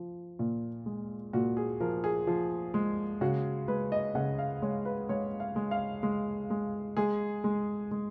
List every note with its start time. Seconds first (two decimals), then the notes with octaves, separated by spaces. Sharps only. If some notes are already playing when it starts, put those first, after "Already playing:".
Already playing: F3
0.39 A#2
0.86 G#3
1.33 A#2 F#4
1.57 G#4
1.80 F3 A#4
2.04 G#4
2.27 F3
2.74 G#3
3.21 C#3 F#4
3.68 G#3 B4
3.92 D#5
4.15 C#3 F#5
4.39 F5
4.62 G#3 C#5
4.85 B4
5.09 G#3 C#5
5.40 F5
5.56 G#3
5.71 F5
6.03 G#3
6.50 G#3
6.97 G#3 G#4
7.44 G#3
7.91 G#3